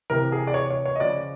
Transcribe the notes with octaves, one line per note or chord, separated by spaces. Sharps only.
C3 E3 A#4
G#4
D5
C#5
C#5
C#5
D#5
C#3 F3 D5